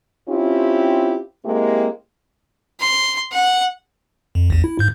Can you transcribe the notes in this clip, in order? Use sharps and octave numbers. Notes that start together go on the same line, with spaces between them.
C4 C#4 E4 F4 G4
G#3 A#3 C4 E4 G4
C6
F#5
F2
A#1 E2
E4
G#2 G6